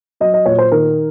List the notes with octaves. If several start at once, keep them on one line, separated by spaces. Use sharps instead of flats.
F#3 D#5
D#5
A#2 C#5
C5
D#3 A#4